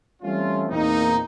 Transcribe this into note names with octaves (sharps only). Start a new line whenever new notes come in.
E3 G3 A3 C4 C#4 F4
E2 A#2 A#3 C4 D#4